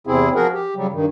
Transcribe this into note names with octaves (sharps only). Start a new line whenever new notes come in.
E2 C3 C4 E4 G#4
F3 F#4 G#4 A#4 F#5
G4
C#3 F#3 G3
G2 D#3